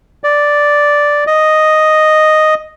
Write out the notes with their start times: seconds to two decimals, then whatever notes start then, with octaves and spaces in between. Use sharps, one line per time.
0.24 D5
1.27 D#5